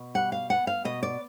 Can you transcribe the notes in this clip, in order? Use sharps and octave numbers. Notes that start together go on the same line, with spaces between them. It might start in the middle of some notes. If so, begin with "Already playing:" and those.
Already playing: B2
G3 F#5
F5
B3 F#5
F5
B2 D#5
D5